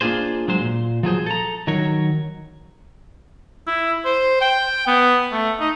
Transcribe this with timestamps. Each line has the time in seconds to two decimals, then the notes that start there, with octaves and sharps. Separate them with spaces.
0.01 A#3 D4 F4 G#4 C5
0.48 F#3 G#3 C5
0.60 A#2
1.03 F3 F#3 G#4 C5
1.26 A4 A#5
1.67 D#3 F#3 A#4 C#5
3.67 E4
4.05 C5
4.41 G5
4.87 B3
5.32 A3
5.60 D#4